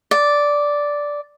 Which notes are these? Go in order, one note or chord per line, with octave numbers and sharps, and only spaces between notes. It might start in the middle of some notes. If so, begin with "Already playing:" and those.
D5